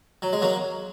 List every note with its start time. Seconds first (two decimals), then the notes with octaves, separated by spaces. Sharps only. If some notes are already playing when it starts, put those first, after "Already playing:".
0.22 F#3
0.33 G#3
0.42 F#3 A#3